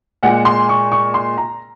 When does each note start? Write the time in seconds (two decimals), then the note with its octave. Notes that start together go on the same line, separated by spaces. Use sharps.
0.23 A#2 G#3 F#5
0.45 C6
0.69 C#6
0.92 C#6
1.14 C6
1.38 A#5